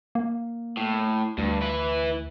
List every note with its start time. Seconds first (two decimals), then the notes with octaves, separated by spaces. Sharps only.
0.15 A#3
0.77 A2
1.38 D2 G2
1.62 E4 B4